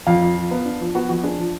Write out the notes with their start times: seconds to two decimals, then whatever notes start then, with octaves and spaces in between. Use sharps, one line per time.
0.07 F2 F5
0.22 F2
0.36 F3
0.51 B3
0.65 D4
0.80 F3
0.95 B3 F#4
1.09 F2 F#4
1.24 D4 G#4
1.38 F3